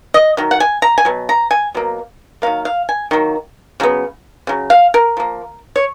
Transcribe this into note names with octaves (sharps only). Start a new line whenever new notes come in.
D#5
D#3 F#3
F#5
G#5
A#5
G#5
B2 F#3
A#5
G#5
B2 F#3 A#3
D#3 F#3 A#3 F5
F5
G#5
D#3 F#3 A#3
C#3 F#3 B3
C#3 F#3
F5
A#4
F3 A#3
C#5